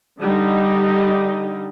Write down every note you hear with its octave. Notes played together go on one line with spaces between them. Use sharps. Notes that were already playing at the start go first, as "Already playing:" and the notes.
D3 G3 D#4